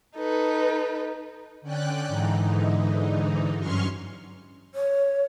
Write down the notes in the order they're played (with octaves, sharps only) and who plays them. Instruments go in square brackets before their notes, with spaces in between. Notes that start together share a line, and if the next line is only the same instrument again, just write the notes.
[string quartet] D#4 A4 B4
[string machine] D3 C#4 D5 G5 F#6
G#2 D3 E3 D#4
G2 F#3 C#4 C6 C#6 F6
[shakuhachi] C#5